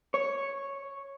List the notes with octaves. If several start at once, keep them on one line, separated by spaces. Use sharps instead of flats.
C#5